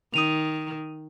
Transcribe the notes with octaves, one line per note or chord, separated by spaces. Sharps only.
D#3 D#6 D#7 F7